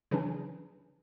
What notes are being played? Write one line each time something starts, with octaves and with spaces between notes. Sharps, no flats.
C#3 E3 F#3 C#4 D4